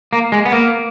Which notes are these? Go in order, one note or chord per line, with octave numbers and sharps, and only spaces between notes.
A#3
G#3
B3
A#3